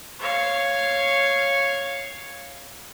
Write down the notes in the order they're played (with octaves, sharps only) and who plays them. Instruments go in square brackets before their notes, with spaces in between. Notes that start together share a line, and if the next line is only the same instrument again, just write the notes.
[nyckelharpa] C#5 F5